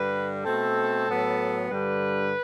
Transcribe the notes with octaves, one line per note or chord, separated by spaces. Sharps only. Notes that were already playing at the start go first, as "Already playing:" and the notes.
Already playing: G2 D3 G3 B4
B2 A3 C4 A4
A2 F#3 B3
G2 D3 G3 B4